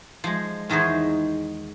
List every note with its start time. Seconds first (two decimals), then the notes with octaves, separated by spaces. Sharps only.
0.24 F3 G#3
0.69 E2 D#3 G#3 G#4 C5 C#5